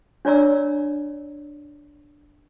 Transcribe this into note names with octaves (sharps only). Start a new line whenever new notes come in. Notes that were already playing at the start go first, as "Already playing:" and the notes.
D4 C#5 D5 A#5 E6